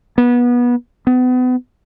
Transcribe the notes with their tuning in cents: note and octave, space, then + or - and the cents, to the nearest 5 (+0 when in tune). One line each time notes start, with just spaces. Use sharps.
B3 -25
B3 +35